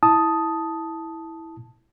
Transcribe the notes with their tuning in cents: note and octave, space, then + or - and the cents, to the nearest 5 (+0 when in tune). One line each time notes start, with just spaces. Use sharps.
E4 -10 A5 +0 D#6 +5